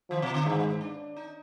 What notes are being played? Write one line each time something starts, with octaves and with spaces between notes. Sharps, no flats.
D#3 F3
B2
D3
G#2 D#3
D4
D#4